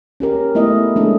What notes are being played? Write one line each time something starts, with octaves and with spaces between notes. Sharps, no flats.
C#4 G4 A#4
A3 B3 E4 D#5
G#3 A3 C#4 D4 G#4 A4